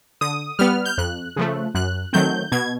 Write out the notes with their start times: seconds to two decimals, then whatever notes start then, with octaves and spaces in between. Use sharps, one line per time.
0.21 D3 D#6
0.59 G3 B3 F6
0.85 G6
0.98 F2 F#6
1.36 C#3 F3 A3
1.75 F#2 F#6
2.13 D#3 F#3 A3 C4 G6
2.52 B2 G#6